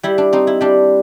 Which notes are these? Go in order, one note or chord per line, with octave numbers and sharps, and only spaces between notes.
G3 E4
D4
C4 D#4
E4
G3 D4